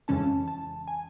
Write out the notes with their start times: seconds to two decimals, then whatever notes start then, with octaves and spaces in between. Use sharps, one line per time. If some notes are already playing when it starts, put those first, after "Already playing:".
0.08 F2 C#3 E3 G#3 C#4 A5
0.48 A5
0.88 G#5